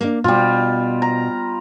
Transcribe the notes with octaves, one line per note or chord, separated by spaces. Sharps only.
A#3 B3 D4
B2 G3 F4
A#5